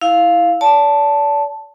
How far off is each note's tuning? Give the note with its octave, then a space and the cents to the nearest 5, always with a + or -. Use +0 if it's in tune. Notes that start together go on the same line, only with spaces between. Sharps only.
E4 -10 F5 +0
D5 -40 A5 +0